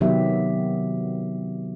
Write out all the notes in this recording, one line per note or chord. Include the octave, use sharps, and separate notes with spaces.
C3 D#3 F#3 B3 G4 E5